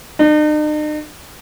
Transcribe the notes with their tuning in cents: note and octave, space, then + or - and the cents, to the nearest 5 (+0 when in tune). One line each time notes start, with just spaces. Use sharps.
D#4 -45